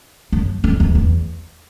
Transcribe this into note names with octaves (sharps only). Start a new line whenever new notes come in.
F#2
F2
E2
E2